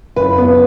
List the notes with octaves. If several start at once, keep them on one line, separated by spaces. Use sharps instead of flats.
F#1 B4
B3